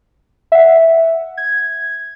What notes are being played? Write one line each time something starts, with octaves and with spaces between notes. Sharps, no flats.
E5 F#5
G#6